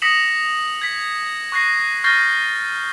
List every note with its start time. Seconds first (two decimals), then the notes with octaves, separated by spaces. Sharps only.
0.02 D#6 A#6 B6 C#7 E7 F#7
0.81 G#6 B6
1.52 C#6 F#6 A#6 C7
2.04 C#6 F6 G6 A6 A#6 C7